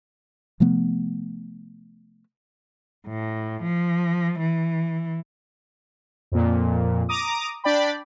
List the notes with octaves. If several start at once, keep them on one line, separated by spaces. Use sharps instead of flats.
C3 F3 A3 B3
A2
F3
E3
F2 A#2
A#5 D6 D#6
D4 D5 G5 B5